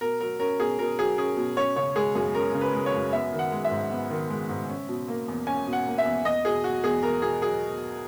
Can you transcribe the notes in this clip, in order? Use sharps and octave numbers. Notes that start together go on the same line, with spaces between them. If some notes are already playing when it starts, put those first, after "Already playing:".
B2 A#4
F#3 A#4
C#4 A#4
B2 G#4
B2 A#4
F#3 G#4
C#4 G#4
B2
C#4 C#5
C#3 C#5
G#3 G#4
F#2 G#4
C#4 A#4
C#3
B4
G#3
C#5
F#2
B3 E5
D#3
F#5
G#3
E5
G#2
B3
D#3
G#3
G#2
C#4
B2
A#3
E2
C#4 G#5
B2
F#5
A#3
E5
E2
E2 D#5
B2 G#4
F#3 F#4
E2 G#4
E2 A#4
B2 G#4
F#3 G#4